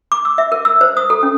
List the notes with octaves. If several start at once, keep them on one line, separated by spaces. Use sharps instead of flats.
D6
E6
E5
A#4
E6
C5
D#6
A4
C#4